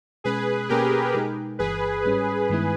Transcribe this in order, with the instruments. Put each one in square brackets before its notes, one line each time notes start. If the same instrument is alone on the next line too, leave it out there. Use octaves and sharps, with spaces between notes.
[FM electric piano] B2 G#3 C#4 [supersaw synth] G#4 B4
[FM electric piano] B2 A#3 C#4 [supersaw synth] G4 A#4
[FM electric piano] B2 G#3 D#4 A#4
[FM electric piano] G1 G2 E3 [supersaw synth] G#4 B4
[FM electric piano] G#2 G3 C#4
G2 D#3 G#3 B3 E4